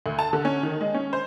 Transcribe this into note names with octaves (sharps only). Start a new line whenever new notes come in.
D2
A5
D3
C#4
D#3
G#3
C#4
C5